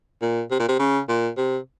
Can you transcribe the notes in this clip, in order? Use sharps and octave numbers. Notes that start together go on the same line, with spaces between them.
A#2
C3
A#2
C3
C#3
A#2
C3